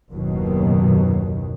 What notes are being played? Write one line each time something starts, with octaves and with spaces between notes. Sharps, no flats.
F#1 D#2 B2 D#3 F#3